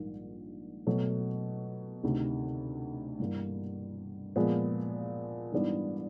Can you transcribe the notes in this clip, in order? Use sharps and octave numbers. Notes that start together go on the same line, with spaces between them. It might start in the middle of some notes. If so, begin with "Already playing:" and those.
Already playing: A#1 G#2 D#3 G3 A#3
B2 F#3 A3
D2 C3 D#3
G1 G2 E3 G3 A#3
A#2 F3 G#3 B3
G#2 E3 G3 B3 D4